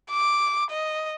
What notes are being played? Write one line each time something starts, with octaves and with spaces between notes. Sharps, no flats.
D6
D#5